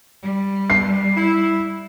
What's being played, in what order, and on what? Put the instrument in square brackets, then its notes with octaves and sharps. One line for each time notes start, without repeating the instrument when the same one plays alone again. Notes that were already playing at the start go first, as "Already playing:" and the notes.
[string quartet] G3
[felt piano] C7
[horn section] E4